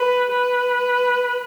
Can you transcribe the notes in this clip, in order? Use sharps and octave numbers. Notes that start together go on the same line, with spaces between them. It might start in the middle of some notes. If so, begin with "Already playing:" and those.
Already playing: B4
B4